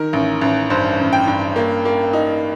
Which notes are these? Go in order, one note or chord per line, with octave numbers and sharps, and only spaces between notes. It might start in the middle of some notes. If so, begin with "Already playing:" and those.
Already playing: D#3 A#4
A1
A1
G2 C5
A1
G5
G2
A#3
A#3
D#4